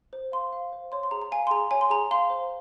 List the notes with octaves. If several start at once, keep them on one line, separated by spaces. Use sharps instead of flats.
C5
F5 C6
F5
C5
C#5 C6
C6
G#4 A#5
A#5
F5 G#5
C6
G#4 A#5
C#5 G#5
C6
G#4 A#5
F5 C6
C5